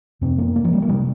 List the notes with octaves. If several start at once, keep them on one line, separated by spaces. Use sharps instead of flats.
F2 C3 C4
A#3
A#3
F3
G3
A#3
C3 G3